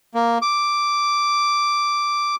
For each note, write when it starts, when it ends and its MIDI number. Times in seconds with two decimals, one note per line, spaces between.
0.14 0.38 58
0.42 2.35 86